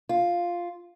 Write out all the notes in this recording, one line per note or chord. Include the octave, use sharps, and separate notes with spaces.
F4